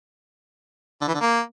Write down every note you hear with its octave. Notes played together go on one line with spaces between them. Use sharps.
D3
E3
D3
A#3